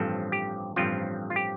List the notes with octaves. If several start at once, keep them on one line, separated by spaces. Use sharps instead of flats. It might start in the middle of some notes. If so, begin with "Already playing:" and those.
Already playing: A1 G2 F3 C4 A4
G4
A1 G2 F3 C4 F4
F4
G4